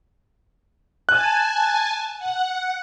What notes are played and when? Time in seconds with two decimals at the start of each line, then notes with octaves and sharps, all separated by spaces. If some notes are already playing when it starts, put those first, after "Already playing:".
1.09 G#5 A5 F#6
2.19 F#5